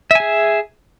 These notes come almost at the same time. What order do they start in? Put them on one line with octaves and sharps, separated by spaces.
E5 G#5 G#4